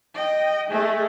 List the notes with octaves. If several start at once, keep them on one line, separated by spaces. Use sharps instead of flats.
D#5 G5
G#3 A3